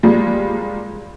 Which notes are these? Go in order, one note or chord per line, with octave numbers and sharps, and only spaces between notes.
A#2 F3 G3 G#3 A#3